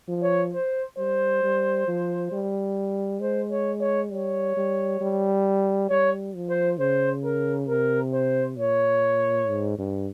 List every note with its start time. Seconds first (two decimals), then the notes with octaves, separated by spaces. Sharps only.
0.09 F3
0.23 C#5
0.53 C5
0.98 G3 C5
1.43 G3
1.88 F3
2.32 G3
3.21 G#3 C5
3.52 C#5
3.81 C#5
4.11 G3 C#5
4.57 G3
5.01 G3
5.90 G3 C#5
6.35 F3
6.50 C5
6.79 C#3 C5
7.24 A#4
7.69 C3 A#4
8.14 C5
8.58 A#2 C#5
9.48 G#2
9.78 G2